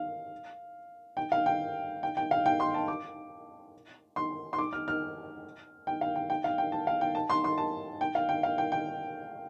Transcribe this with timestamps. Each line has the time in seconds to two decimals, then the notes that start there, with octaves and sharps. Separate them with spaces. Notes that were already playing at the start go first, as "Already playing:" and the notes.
Already playing: F5
1.17 G5
1.32 F5
1.46 G5
2.03 G5
2.17 G5
2.31 F5
2.46 G5
2.60 C6
2.74 A5
2.88 D6
4.16 C6
4.53 C6
4.58 D6
4.73 F6
4.88 F6
5.87 G5
6.01 F5
6.16 G5
6.30 G5
6.44 F5
6.58 G5
6.72 A5
6.87 F5
7.01 G5
7.15 A5
7.30 C6
7.44 C6
7.58 A5
8.01 G5
8.15 F5
8.29 G5
8.43 F5
8.58 G5
8.72 G5